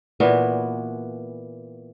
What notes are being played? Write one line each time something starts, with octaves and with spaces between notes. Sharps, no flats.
A#2 E3 B3 F#4